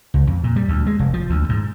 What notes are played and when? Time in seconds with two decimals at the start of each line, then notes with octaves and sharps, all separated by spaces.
0.14 C#2
0.27 F2
0.44 A#2
0.56 G3
0.68 D2
0.87 G#3
0.99 F1
1.14 F3
1.30 D2
1.49 G#2